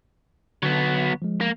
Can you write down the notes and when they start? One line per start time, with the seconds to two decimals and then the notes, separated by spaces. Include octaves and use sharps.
0.63 D3 F#3 B3
1.22 F3 G#3
1.41 A#3